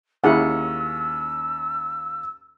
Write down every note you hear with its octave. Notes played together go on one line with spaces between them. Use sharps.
D#2 C#4 E4 G#4 F#5 E6